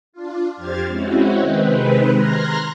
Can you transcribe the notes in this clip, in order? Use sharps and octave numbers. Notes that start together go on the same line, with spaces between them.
D4 F4
F2 G4 C5 F6 G#6 A6
G#3 C4 C#4 E4 F#4
C3 D#3 G#3 C4 B4
A#5 C6 F6 F#6 G#6 A#6